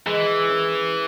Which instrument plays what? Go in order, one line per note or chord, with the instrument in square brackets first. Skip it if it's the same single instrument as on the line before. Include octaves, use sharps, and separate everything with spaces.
[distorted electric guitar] E3 [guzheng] G#3
[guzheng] C#4